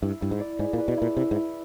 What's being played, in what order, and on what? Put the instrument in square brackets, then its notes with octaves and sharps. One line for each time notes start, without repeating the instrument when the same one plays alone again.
[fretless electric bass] G2 [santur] E4
[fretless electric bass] G2 [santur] E4
[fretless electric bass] G#2
[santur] D5
[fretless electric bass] G#2 [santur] G#4
[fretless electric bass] A#2
[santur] B4
[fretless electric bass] B2
[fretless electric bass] A#2 [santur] E4
[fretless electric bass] C3 [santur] E4
[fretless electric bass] G#2
[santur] E4